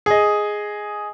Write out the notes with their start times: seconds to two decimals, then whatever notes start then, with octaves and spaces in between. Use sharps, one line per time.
0.06 G#4 D#5